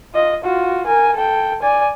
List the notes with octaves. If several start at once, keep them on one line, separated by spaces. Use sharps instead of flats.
F4 D#5
F4 F#4
A#4 G#5
A4 G5
D5 G#5